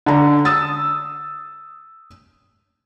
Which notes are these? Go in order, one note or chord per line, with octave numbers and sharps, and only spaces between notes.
D3 A#5
D#6 E6 A6